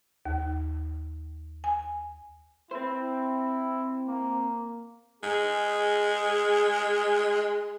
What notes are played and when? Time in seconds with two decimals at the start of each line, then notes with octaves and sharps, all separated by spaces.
0.25 D#2
1.64 G#5
2.71 C4 E4 C5
4.08 A#3
5.23 G#3 G#4